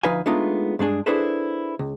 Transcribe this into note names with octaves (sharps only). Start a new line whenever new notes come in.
D2 F3 D#4 B4 F5 G#5
G#3 A3 B3 D4 D#4 F4
G2 G#3 D4 G#4
D4 E4 G#4 A4 B4 C5
C#2